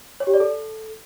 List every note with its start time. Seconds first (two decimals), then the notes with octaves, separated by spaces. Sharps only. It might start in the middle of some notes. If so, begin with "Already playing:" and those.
0.20 C#5
0.27 G4
0.34 D5
0.40 A4